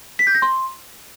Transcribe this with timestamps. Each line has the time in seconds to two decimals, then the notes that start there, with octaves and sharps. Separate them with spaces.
0.19 B6
0.27 G6
0.35 A#6
0.42 C6